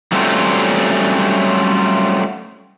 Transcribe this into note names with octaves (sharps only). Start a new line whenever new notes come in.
F#3 G3 A3 C4 C#4 F4